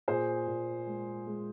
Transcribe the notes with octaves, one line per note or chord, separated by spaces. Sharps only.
A#2 G#4 C5
A#2
G#3
G#3